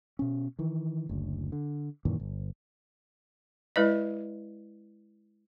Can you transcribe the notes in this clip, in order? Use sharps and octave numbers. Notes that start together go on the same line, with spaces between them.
B2 C#4
D#3 E3
F#1 D2
D3
F#2 A#2 D#3 E3
G1
G#3 E4 B4 D5 D#5